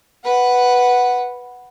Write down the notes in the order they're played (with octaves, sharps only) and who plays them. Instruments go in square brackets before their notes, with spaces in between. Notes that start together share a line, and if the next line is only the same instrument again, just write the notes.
[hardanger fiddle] B4 F#5